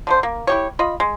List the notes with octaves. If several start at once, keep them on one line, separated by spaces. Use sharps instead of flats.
D3 A3 C5
A#3
E4 G4 C#5
F4 D#5 B5
G#3